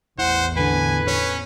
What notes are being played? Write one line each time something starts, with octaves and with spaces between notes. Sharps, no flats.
A1 E2 E4 C5 F#5
D3 B3 B4 G#5
C#4 C#5